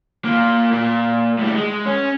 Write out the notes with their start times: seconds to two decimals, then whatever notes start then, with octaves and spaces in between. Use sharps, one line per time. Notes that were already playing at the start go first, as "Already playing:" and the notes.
0.25 A#3 F4
0.73 A#2
1.39 A2 G3
1.55 G#3
1.85 C#4